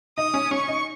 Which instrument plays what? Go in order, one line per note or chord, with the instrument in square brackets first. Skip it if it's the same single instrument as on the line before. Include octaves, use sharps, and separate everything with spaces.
[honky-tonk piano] D#4 [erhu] D#6
[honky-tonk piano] C#4
[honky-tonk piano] C#4 [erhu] C#6
[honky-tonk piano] D#4